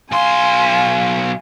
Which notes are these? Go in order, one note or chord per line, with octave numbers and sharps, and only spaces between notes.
B1 F5 G#5 C6